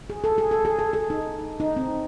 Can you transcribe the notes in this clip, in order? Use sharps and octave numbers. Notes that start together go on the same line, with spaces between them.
G#4
A4
G#4
A4
G#4
A4
G#4
D#4
D#4
C4